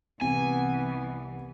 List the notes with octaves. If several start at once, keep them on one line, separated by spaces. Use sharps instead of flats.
C2 E3 B3 G#5